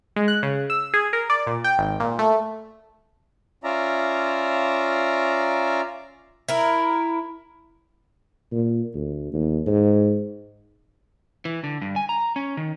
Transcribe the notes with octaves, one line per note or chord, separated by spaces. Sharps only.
G#3
F#6
C#3
E6
G#4
A#4
D5
A#2
G5
G#1
A#2
A3
C#4 F4 D5 E5 A#5
E4 A#4
A#2
D2
D#2
G#2
E3
D3
G2
G#5
A#5
C#4
D#3